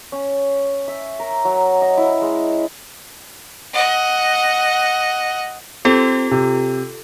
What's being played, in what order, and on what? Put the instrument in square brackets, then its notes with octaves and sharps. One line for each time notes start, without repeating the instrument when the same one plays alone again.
[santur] C#4
E5
A#4
F#3
D#5
E4
G#3
[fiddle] D#5 F#5
[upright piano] C4 [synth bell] F4 G4 A4
[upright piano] C3